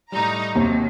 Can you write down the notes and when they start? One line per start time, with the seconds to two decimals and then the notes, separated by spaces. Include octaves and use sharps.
0.12 A2 G3 D#4 A#5
0.55 D#2 C3 D#3 F#3